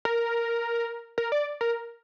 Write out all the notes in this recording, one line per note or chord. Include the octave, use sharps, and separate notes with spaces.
A#4
A#4
D5
A#4